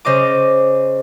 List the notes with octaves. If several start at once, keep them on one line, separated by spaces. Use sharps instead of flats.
C#3 C5 D#5 D6